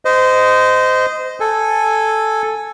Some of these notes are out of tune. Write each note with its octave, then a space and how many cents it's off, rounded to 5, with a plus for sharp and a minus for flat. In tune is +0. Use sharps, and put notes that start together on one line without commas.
C5 -25 D#5 +0
A4 +0 G#5 +0